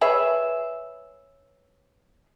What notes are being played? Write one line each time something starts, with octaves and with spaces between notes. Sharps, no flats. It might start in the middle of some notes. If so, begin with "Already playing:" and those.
G#4 B4 C#5 E5